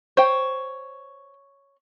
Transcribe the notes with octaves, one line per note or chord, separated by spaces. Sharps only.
C5 C#5 G5